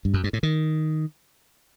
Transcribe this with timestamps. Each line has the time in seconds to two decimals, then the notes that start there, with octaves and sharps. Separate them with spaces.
0.05 G2
0.14 F#2
0.24 G2
0.33 A2
0.43 D#3